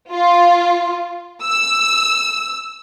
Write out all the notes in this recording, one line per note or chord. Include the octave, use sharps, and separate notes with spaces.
F4
E6